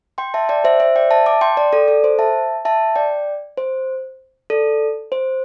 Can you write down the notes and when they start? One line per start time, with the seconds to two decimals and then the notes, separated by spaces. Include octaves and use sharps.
0.18 G5 C6
0.34 E5 A5
0.49 D5 G5
0.64 C5 E5
0.80 C5 E5
0.96 D5 G5
1.11 E5 A5
1.26 A5 D6
1.41 G5 C6
1.57 D5 G5
1.73 A4 D5
1.88 A4
2.04 C5
2.19 E5 A5
2.65 E5 A5
2.96 D5 G5
3.58 C5
4.50 A4 D5
5.12 C5